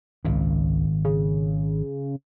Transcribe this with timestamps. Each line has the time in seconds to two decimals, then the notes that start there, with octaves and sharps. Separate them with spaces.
0.25 G#1 C#2 A#2
1.05 C#3